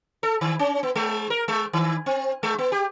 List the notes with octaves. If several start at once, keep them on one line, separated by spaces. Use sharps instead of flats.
A4
D#3
C#4
B3
G#3
A#4
G#3
D#3
C4
G#3
B3
G4